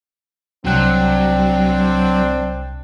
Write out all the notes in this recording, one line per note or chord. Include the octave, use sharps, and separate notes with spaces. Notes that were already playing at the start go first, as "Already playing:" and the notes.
C2 F#3 C4 D4 F#6